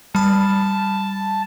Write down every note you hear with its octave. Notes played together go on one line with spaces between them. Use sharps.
G3 A5 B5